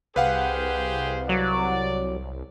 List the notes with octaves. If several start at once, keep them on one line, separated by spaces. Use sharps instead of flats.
C2 G4 G#4 B4 C5 F5 F#5
F#3 D5